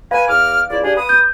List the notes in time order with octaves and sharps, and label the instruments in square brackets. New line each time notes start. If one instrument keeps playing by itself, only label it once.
[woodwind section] B4 G#5 [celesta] F5
[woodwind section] E2 D6 F6
C#2 E4 D5
D4 G4 G#4
B4 D#6
[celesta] G6